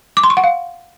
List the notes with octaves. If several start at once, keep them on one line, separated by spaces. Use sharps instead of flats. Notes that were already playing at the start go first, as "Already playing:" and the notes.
D6
C6
C#6
F#5
F5